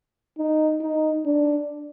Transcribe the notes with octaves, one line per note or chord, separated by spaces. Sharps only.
D#4
D#4
D4